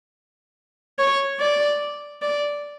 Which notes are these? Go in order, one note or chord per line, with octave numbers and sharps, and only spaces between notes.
C#5
D5
D5